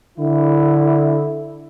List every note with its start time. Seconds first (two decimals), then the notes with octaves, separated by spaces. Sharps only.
0.18 D3 E4